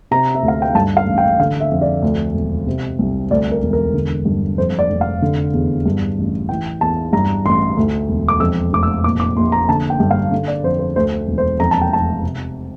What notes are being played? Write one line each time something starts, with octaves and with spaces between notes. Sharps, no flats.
C3 A#5
E5
D2
F5
G5
G2 A5
F5
A1
G5
D3 F5
E5
F2
D5
D2
E1
C3
C2
D2 D5
A#4
E1
A#4
D3
G2
F2 C5
D5
F1
F5
D3
E2
G2
A1
E3 G5
E2 A5
G2 A#5
A1 C6
D2
E1
D6
F2 E6
F1 D6
E6
A#2 D6
D6
A#1 C6
A#5
D3 A5
G5
G2
F5
D3
D5
F2 C5
C5
D2 C5
E1
C5
F2 A#5
A5
G5
F1 A5
C3